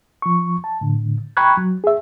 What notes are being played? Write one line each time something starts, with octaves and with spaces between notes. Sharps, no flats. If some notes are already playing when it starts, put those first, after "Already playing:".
F3 C#6
A5
A2 D3
G5 A#5 B5 C#6 F#6 G#6
F#3
G#4 E5